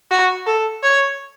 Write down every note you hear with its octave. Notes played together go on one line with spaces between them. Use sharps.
F#4
A4
C#5